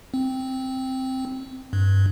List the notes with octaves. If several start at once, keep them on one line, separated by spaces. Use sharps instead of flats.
C4
G2